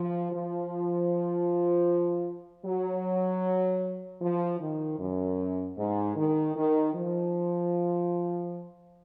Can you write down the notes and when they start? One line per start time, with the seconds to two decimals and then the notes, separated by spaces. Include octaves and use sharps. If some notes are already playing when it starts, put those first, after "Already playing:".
Already playing: F3
0.32 F3
2.65 F#3
4.21 F3
4.60 D#3
4.99 F#2
5.76 G#2
6.16 D#3
6.55 D#3
6.93 F3